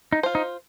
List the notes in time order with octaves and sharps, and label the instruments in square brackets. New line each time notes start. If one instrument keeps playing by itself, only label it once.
[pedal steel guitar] D#4
[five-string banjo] F4 C5
[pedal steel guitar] D#4